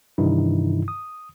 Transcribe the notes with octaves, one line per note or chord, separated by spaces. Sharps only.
G2 C3 D#3 E3 D#4 E4
D#6